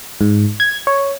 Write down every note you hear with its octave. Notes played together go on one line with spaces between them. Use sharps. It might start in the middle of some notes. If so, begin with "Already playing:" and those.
G#2
G#6
C#5